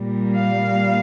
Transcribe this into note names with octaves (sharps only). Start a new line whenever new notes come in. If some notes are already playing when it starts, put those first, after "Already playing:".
Already playing: A#2 G3 A#3
F5